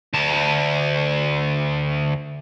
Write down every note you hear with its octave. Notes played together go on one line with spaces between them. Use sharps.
D2 A5